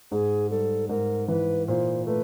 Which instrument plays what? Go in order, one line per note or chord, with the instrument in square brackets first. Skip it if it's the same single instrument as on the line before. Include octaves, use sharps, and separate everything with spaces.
[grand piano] G#2 [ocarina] G#4
[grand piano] G3 [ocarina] A4
[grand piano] G#2 [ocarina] A#4
[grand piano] E3 [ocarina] B4
[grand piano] A#2 [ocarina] C5
[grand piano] A3 [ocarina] B4